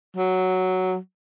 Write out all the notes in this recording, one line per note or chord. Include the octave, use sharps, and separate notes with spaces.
F#3